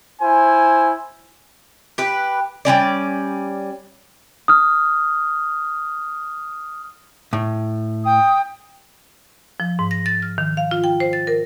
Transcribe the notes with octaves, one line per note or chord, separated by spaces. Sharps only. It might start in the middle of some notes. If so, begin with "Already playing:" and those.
E4 C5 G#5
G4 B4
G3 G#3 C#4 D5
D#6 F6
A2
G5 D#6
F3
G#2
A#6
A6
F6
D#3
F5
F4
G5
C5
A6
A#4